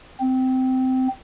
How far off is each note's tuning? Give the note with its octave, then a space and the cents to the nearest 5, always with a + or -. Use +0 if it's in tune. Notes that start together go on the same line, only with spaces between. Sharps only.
C4 -15